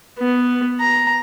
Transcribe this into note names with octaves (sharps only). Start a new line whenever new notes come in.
B3
A#5